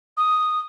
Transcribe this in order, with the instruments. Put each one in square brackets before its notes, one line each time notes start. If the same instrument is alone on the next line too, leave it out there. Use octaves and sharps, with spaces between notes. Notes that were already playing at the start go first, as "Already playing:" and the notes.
[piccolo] D#6